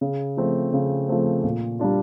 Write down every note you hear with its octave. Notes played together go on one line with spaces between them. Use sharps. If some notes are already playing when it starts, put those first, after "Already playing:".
C#3
F3 A3 C4
C#3
F3 A3 C4
A#2
G3 A#3 D4 F4